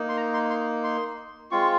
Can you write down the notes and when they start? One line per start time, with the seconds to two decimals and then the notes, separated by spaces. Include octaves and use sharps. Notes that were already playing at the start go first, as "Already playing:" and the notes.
Already playing: A#3 D#4
0.09 C6
0.17 A#5
0.34 C6
0.50 C6
0.84 C6
1.51 G#3 C4 F4 C#6